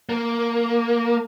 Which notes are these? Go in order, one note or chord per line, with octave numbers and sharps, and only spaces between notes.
A#3